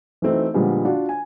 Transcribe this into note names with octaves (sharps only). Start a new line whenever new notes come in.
E3 F#3 A3 C4 D#4
A#2 D3 F3 G3 G#3 B3
D4 F4 F#4
G#5